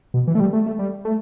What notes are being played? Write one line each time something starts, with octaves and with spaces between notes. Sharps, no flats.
B2
E3
A3
G3
A3
A3
G3
A3